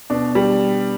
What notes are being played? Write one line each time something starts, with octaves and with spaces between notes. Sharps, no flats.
B2 D4
G3